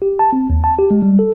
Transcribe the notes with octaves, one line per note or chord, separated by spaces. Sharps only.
G4
A5
C4
D#2
A5
G4
G#3
G3
A4